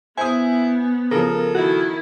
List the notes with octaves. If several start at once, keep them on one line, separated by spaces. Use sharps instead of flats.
B3 E4 C5 G#5 D#6
C#3 F3 A4 A#4
D#3 E4 F#4